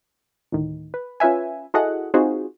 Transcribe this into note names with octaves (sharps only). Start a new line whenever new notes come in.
D2 A2 D#3
B4
C#4 F4 B4 E5 G#5
E4 F#4 G#4 A4 D#5 F#5
C4 D#4 F4 F#4 G#4 C5